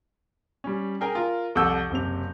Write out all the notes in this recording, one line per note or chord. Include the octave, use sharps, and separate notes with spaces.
G3 C#4
G#4 A#4 G5 G#5 A#5
F4 A#4
C2 F2 A4 F#5 E6 G6
F#1 C3 F7